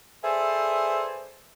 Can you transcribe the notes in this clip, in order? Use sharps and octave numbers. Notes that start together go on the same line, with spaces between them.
G#4 A4 B4 C5 D5 E5